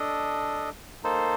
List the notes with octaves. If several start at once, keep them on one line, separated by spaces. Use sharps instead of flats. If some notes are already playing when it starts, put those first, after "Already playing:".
Already playing: D4 A4 D#5
A#3 D#4 A4 C5